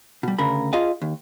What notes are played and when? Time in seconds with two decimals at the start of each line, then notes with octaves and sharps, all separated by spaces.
0.23 B2 G3
0.38 D2 C#3 A#4 B5
0.73 F4 G#4 D#5 F5
1.02 D#2